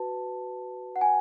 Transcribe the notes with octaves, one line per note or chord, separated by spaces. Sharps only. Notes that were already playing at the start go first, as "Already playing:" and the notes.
Already playing: F#4 B4 A5
F#5
G#5